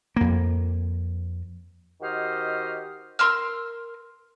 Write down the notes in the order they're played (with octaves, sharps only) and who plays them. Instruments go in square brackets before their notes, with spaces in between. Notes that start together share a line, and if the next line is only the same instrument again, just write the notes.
[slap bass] F2 A#3
[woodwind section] D#3 F#4 G4 C5 D#5 F6
[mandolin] A#4 C6 E6 F6